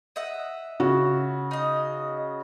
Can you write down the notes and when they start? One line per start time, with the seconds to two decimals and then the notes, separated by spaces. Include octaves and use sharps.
0.16 D#5 E5 F#5
0.80 C#3 F#4
1.51 D#4 D#5